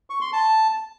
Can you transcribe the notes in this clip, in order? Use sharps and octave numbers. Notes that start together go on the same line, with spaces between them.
C#6
C6
A5